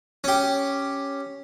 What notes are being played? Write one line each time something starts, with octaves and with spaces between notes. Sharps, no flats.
C#4 G4